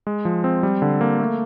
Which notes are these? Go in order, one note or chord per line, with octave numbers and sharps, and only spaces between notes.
G#3
F3
C4
G3
D3
A#3
A3